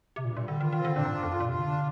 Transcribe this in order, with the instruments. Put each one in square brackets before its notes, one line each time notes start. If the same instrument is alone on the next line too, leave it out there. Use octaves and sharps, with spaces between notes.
[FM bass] C3
[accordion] G2 [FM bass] A#2
[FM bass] A#2
[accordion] G3
[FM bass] D3
[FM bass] D#3 [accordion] F4
[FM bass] D#3
[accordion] C4
[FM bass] D3
[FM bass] A#2 [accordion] D4
[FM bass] G#2
[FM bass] G2 [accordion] F4
[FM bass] F2
[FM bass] G2 [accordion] F4
[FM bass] A#2
[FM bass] C3 [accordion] F4
[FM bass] D3
[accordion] D4